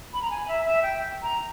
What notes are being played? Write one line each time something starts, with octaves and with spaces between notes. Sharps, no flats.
B5
A#5
G#5
E5
E5
G5
A#5